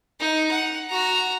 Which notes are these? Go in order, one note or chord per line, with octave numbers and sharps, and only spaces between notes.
D#4
F#5
F#4 A#5